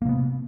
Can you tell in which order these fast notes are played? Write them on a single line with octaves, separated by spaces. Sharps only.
A#3 C3 B3